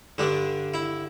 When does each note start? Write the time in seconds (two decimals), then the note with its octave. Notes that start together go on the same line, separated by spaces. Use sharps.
0.18 G2 D3 D4
0.74 E4